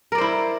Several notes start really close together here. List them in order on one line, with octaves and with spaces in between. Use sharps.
A#4 D5 C5 E4